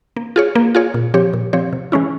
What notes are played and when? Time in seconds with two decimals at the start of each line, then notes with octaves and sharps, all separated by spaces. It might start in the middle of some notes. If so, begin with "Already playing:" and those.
0.16 A#3
0.36 F4 G#4 C#5
0.55 A#3
0.75 F4 G#4 C#5
0.94 A#2
1.14 F3 C4 G4 C#5
1.33 A#2
1.53 F3 C4 G4 C#5
1.73 C3
1.92 E3 G#3 C#4 E4